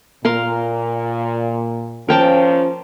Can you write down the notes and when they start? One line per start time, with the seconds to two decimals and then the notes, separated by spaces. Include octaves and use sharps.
0.25 A#2 A#4 F5 C6
2.09 F3 C#4 A#4 G5 A5